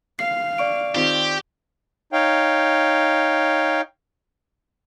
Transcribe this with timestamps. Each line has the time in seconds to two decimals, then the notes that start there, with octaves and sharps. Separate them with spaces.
0.19 F5 C7
0.58 D5 C#6 D7
0.95 D#3 C4 F4 G4
2.13 D#4 C#5 F5 G5